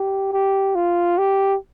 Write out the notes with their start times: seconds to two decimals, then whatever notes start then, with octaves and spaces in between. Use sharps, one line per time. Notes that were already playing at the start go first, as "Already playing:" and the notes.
Already playing: G4
0.33 G4
0.75 F4
1.18 G4